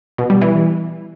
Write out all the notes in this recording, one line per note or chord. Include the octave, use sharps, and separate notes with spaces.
B2
G3
E3